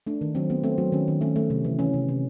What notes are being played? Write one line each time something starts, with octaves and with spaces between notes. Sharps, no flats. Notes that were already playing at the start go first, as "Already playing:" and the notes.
A3 D4
D#3
F#3 C4
A3 B3
A3 C4
F#3
D#3 C#4
D#3
A3 C#4
A3
C3
E3
E3 C#4
C3
C3